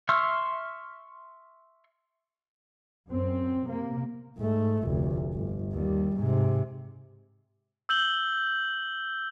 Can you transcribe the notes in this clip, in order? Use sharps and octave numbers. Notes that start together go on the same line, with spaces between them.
E5 C6 C#6 E6 F6
F#2 C4
C3 A#3
G#2 A3
F1 D2
G1
D#2 G3
G#2 C3
E6 G6 F#7 G7